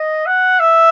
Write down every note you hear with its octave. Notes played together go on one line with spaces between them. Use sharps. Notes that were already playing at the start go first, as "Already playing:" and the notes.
Already playing: D#5
F#5
E5